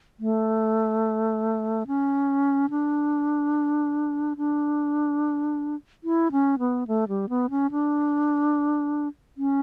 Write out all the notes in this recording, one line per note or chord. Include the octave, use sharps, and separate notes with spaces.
A3
C#4
D4
D4
E4
C#4
B3
A3
G3
B3
C#4
D4
C#4